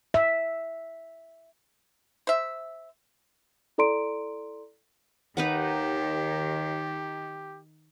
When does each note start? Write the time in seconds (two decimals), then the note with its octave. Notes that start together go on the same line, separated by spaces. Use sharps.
0.14 E5
2.27 C5 E5
3.78 E4 A4 D5 A#5 C6 D7
5.37 D#2 D#3 D#4 G4 B4 F#5